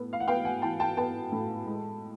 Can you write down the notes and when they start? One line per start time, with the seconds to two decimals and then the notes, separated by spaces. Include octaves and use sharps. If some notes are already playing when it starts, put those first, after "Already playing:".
Already playing: A2 B3
0.13 F5
0.20 F#5
0.28 B3 F5 G5
0.45 F#5 G#5
0.62 E3 G5 A5
0.80 G5 A5
0.97 B3 G5 A5
1.32 A2
1.66 G#3